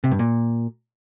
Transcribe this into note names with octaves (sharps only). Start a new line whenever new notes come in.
C3
G2
A#2